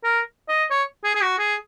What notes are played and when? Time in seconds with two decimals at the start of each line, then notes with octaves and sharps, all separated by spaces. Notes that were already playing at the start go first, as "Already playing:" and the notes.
0.04 A#4
0.48 D#5
0.71 C#5
1.04 G#4
1.15 G#4
1.22 F#4
1.39 G#4